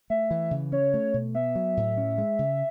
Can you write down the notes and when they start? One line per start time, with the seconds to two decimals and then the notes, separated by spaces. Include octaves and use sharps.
0.10 A3 E5
0.31 E3
0.51 C#3
0.72 C#4 C#5
0.94 A3
1.14 B2
1.35 B3 E5
1.55 F#3
1.77 A2
1.97 C#4
2.18 G#3
2.39 C#3